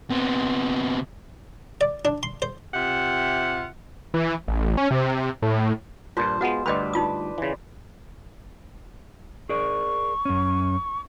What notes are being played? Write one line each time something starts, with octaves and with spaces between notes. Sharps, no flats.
C3 B3
D5
D4
C6
C5
C3 F4 G4 E5 F#5
E3
A1
C#4
C3
A2
G2 A#2 F4 C5 A5
G#3 B3 F4 F#4 F#5
D2 G2 B4 C5 D5 D#5 G5 B5
D#4 F4 D#6
C#3 E3
G#4 A#4 D5 C#6
F#2 C#4